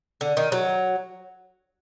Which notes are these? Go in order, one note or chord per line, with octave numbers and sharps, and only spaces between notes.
D3
D#3
F#3